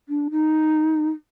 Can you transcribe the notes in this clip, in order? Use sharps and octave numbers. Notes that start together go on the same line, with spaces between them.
D4
D#4